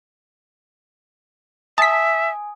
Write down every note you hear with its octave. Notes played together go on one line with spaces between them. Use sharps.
E5 G#5 A5 D#6 B6